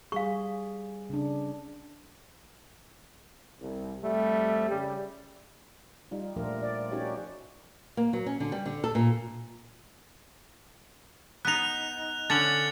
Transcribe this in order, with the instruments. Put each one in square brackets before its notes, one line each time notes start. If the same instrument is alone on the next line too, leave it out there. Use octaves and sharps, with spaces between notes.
[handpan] G3 G#4 [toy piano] F5 C#6
[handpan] C#3 D4
[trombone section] C2
F2 G3 A3
C#3 G3
[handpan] G3 D#4 F4
A#2 F3 A3 D4 F4 A#4
D5
C#4 D#4 F#4 G4 C#5 D5
[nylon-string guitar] A#3
F#3
C#4
D3
G3
D3
A4
A#2
[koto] B3 D#4 [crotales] F#6 F7
[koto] D3 C#4 [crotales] A6 C#7 F#7